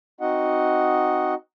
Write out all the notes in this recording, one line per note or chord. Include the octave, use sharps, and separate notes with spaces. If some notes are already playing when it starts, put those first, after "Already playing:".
C4 D#4 F#4 D#5 F#5